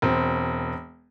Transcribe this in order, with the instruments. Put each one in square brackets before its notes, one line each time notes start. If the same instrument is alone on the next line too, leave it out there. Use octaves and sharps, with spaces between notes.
[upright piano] E1 C4